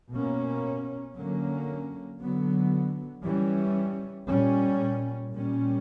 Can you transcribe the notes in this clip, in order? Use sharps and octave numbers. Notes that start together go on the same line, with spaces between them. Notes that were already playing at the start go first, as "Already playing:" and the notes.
B2 A#3 C#4
D3 F#3 A#3 C#4
D3 F#3 B3
E3 G3 C#4
A#2 G3 C#4
A#2 G3 C#4